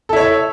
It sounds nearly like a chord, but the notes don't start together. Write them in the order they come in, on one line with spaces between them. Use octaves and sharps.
A4 E4 C#5 E5